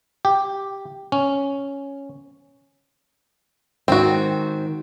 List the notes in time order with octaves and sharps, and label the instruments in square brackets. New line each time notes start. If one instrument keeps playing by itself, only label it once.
[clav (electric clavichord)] G4
C#4
[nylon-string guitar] G#2 D#3 [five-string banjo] C4 F#4